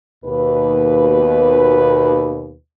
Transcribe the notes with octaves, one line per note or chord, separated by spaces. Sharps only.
D#2 B2 B4